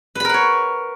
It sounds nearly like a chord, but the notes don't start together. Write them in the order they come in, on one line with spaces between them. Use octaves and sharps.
B4 B5 A#4 F#5 C#5